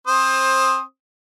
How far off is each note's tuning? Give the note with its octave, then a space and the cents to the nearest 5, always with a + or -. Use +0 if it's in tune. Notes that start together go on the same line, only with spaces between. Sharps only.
C4 +25 C5 +20 D#6 +0